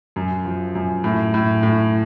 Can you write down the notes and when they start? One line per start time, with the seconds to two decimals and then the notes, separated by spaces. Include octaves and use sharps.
0.16 F#2
0.45 F3
0.75 F#2
1.04 A2
1.34 A2
1.63 A2